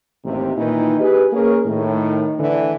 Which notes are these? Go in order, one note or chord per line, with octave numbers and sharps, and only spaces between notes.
A1 D#2 C3
A#2 D#3 E3 D#4
G4 G#4 B4
A#3 C#4 G#4 A#4
A2 D#3
D3 E3